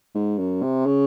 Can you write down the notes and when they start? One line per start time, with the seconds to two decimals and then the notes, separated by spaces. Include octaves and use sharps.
0.15 G#2
0.38 F#2
0.62 C3
0.86 C#3